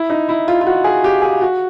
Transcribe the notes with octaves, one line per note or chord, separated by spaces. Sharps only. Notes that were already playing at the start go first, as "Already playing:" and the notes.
Already playing: E4
D#4
E4
F4
F4
F#4
G#4
G4
G#4
F#4